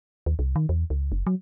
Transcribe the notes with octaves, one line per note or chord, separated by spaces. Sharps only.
D#2
C2
D#3
E2
C#2
F#1
F#3